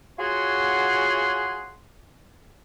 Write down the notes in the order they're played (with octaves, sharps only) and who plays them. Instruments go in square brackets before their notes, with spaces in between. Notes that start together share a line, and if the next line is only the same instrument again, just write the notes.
[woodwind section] F4 F#4 G#4 C#5 F#5 C6